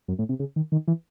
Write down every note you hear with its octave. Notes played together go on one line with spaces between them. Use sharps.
F#2
A2
C3
C#3
D#3
D#3
E3